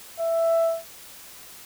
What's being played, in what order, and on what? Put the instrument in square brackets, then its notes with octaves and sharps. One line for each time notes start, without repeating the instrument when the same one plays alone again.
[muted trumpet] E5